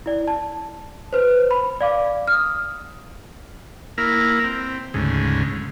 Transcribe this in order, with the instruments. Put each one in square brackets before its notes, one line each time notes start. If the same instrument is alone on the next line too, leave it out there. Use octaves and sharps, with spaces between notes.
[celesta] E4 D5
A5
B4 C5
B5
D5 F5 D6
D#6 F6
[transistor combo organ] A#3 E4 A#4
C4
D2 G#2 C#3